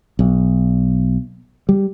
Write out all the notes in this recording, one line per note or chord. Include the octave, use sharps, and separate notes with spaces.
B1
G3